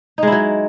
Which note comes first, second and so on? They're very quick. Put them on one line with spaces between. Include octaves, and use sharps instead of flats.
D#4 G#3 E4 F#3